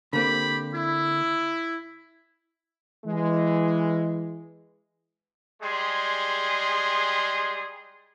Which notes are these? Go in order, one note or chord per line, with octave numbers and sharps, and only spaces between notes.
D3 A#3 C4 G4 B5
E4
E3 G#3
G3 G#3 G#4 C6